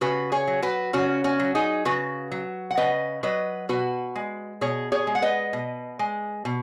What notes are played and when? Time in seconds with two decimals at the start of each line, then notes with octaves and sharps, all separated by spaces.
0.01 C#3 F#4 B4
0.32 G#4 C#5
0.47 F#3
0.62 F#4 B4
0.93 C#3 C#4 F#4
1.24 C#4 F#4
1.39 F#3
1.55 D#4 G#4
1.85 C#3 F#4 B4
2.32 F#3
2.71 F#5
2.77 C#3 B4 D#5
3.23 F#3 B4 D#5
3.69 B2 F#4 B4
4.16 G#3
4.61 B2 G#4 C#5
4.92 G#4 C#5
5.07 G#3
5.15 F#5
5.22 B4 D#5
5.53 B2
5.99 G#3
6.45 B2